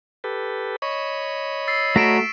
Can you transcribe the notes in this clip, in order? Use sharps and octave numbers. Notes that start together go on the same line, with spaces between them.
G4 A4 B4
C#5 D#5 B5 C#6
E6 A6 C7
A3 F#4 A#5 B6 D7 E7